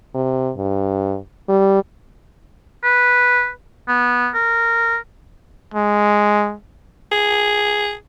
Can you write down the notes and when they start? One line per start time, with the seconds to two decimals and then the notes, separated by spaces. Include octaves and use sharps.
0.15 C3
0.57 G2
1.49 G3
2.84 B4
3.88 B3
4.34 A#4
5.74 G#3
7.12 G#4